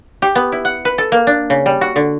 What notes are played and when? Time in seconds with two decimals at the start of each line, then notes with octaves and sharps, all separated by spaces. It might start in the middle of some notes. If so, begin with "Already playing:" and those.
0.22 G4
0.35 B3
0.52 E4
0.65 F#5
0.85 B4
0.98 A4
1.12 A#3
1.27 D4
1.50 C#3
1.66 G3
1.81 F#4
1.96 D3